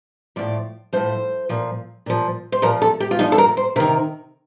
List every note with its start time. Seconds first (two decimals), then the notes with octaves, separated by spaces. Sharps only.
0.36 A2 F3 D5
0.93 A2 F3 C5
1.49 A#2 F3
2.06 A#2 F3
2.52 C5
2.62 A#2 F3 A#4
2.82 A4
3.00 G4
3.11 F4
3.19 A#2 F3 D#4
3.32 A4
3.38 A#4
3.57 C5
3.76 C3 D#3 A#4